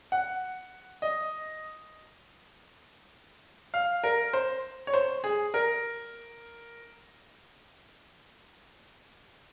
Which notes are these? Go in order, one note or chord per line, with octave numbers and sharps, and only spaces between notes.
F#5
D#5
F5
A#4
C5
C#5
C5
G#4
A#4